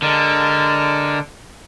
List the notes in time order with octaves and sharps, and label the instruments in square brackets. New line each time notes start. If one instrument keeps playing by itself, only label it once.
[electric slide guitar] D3 [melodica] G#3 A#4 A5